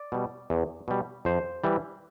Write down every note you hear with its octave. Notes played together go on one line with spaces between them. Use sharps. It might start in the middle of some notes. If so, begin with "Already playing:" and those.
Already playing: D5
B2 G3
E2
B2 G3
F2 C5
E3 G3